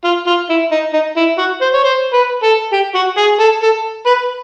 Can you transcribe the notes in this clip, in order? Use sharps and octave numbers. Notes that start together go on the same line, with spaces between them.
F4
F4
E4
D#4
D#4
E4
F#4
C5
C#5
C5
B4
A4
G4
F#4
G#4
A4
A4
B4